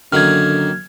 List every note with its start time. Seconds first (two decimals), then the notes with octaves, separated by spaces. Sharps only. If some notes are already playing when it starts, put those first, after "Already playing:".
0.12 F#2 D3 D#3 A#3 F6 G#6